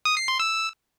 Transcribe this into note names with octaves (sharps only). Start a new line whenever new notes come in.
D#6
C7
C6
E6